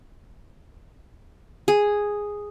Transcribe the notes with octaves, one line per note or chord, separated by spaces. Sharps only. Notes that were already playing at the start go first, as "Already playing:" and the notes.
G#4